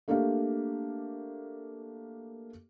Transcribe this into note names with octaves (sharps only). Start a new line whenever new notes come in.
A3 A#3 D4 G4 F5